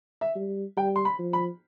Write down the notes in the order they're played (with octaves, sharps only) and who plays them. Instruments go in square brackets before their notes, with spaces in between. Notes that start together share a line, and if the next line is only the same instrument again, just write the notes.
[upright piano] E5
[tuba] G3
[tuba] G3 [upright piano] G5
[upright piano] C6
B5
[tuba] F3
[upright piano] B5